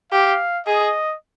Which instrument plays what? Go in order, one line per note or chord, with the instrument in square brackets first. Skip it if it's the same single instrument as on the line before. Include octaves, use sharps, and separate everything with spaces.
[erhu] G4 [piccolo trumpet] F5
[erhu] G#4 [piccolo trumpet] D#5